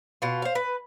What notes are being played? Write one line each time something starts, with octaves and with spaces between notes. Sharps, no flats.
B2 F4
C5 F5
B4